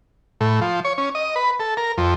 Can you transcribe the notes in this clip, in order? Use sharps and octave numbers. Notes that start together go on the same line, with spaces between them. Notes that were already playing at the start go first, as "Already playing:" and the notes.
A2
F3
C#5
C#4
D#5
B4
A4
A#4
F2